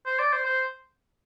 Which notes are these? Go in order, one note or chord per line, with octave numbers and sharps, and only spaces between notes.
C5
D5
C5
C5